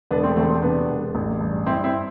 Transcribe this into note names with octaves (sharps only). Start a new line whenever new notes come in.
E1 B3 D4
A3 C4
E2 A3 C4
A3 C4
C3 B3 D4
E1
A1
G2
G2 C4 E4
C4 E4